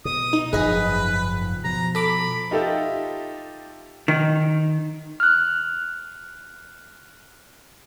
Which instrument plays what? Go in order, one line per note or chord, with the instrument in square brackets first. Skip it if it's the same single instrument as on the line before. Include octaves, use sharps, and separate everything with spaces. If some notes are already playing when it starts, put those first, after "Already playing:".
[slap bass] B2 [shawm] D#6
[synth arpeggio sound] D#4
[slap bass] F#1 G#2 F3 [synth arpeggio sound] G#4 D#5 [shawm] B4
[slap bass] B2 F3 [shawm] A#5
[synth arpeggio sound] A4 D6 [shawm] B5
[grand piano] D#4 F4 G4 A4 E5
[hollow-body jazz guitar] D#3
[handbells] F6 F#6